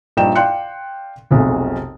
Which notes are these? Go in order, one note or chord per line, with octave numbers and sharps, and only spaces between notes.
A#1 G2 D#4 D5 G5 E7
D5 F5 G5 C6 F#6 C#7
F1 B1 C3 G#3